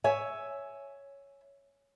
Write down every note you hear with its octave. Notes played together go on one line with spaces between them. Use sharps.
C#5 E5 G#5